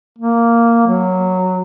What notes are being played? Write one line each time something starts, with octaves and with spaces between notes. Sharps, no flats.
A#3
F#3